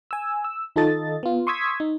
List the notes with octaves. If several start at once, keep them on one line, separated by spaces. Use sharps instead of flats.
G#5 E6
E6
D#3 D#4 F4 A4 D#5 A6
B3 F4
C6 C#6 D#6 E6 G#6 B6
D#4